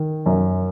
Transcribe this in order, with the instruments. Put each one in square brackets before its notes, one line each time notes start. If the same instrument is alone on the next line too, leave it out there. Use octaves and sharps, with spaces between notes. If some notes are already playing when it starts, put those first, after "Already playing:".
Already playing: [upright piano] D#3
F#2